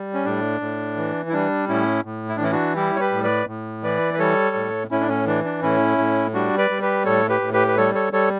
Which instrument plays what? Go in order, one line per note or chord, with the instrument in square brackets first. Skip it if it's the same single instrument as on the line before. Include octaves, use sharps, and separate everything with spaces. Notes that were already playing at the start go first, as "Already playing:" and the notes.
Already playing: [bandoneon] G3
C#4
A2 D4
A2
E3
E4
G3 D4
A2 C#4 E4
A2
E4
D4
E3 C#4 E4
D4 F#4
G3 E4 G4
C#5
G4 B4
A2
B4 D5
A2
E3 B4 D5
B4
G3 A4 C#5
A2
A2 C#4 E4
D4
C#4
E3 D4
D4
A2 C#4 E4
A2
G3 D4 F#4
B4 D5
G3
G4 B4
A2 A4 C#5
G4 B4
A2
G4 B4
B4
G3 A4 C#5
A4 C#5
G3 A4 C#5